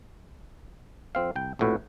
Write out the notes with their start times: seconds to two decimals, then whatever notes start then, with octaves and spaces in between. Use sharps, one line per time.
1.15 F2 C4 F5
1.36 C2 G5
1.59 A#1 F2 A2 F#4 B4